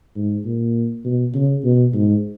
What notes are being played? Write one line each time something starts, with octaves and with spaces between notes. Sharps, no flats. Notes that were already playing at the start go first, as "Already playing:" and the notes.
G#2
A#2
B2
C#3
B2
G#2